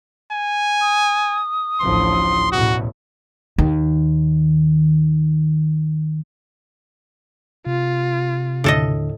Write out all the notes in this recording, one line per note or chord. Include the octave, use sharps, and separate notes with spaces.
G#5
D#6
A1 D2 F3 C6
A1 E2 B2 F#4
D#2 D#3
C3 F4
D#2 A2 D3 A4 D#5